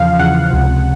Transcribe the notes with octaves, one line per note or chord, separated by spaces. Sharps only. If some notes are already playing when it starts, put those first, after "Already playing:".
Already playing: E2 C#3 F3 F5
E2 C#3 F3 F#5
C#2 C3 F3